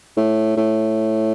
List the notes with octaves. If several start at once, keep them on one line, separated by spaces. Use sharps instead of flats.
A2
A2